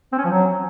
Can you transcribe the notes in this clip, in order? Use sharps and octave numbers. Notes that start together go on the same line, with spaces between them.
C4
C#4
F3
F#3